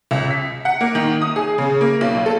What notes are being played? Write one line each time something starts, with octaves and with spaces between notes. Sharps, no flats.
C#2
B6
F#5
A#3
D#3
D#6
G#4
C#3
A#3
B1
A4